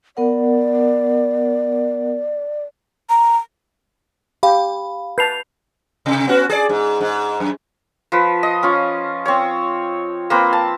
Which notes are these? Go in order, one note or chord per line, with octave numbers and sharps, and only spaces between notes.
B3 A#4 D5 F#5
A#5
G4 F5 B5
B4 A5 G6 C7 F7
C3
B3 C#4 F#4
G#4 D5
G#2
G#2
F#2
F3 B4
D#5
C#4 F4
C4 C#5
A#3 C4 B4
A5